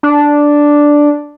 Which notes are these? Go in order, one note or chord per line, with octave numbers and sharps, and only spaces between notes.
D4